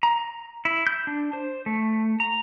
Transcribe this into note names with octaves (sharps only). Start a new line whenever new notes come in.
A#5
E4
G6
D4
C5
A3
A#5